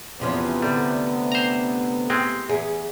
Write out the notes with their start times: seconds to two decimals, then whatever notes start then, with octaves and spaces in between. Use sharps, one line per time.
0.20 E2 C3 F3 B3 C#4
0.62 D3 G3 A3
1.32 C5 A#5
2.10 G#3 C4 G4
2.50 E2 G#4